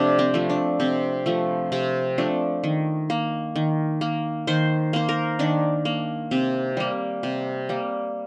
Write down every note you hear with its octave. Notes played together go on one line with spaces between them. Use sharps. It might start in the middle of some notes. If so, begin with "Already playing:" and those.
Already playing: C3 F3 A3 D4
C4
F3 A3
D4
C3 C4
F3 A3
C3 C4
F3 A3 D4
D#3
A#3
D#3
A#3
D#3 C5
A#3 C5
A#4
D#3 D4
A#3
C3 C4
G3 A#3
C3
G3 A#3